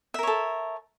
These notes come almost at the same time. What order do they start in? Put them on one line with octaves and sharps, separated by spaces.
E5 A#4 C#5 A4